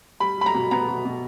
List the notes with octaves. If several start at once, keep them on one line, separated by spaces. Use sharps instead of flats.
G3 B5
G3 B5
A#5
B2
B3 A#5
B2
B2